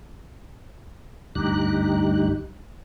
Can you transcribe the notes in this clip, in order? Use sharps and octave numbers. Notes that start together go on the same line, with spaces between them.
D2 G2 D#4 G4 F#6